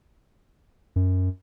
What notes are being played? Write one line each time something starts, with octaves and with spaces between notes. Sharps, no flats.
F#2